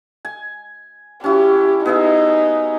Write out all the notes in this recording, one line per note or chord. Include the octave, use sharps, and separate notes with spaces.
G#5
C#4 E4 F#4 G4
B3 D#4 G#4 E5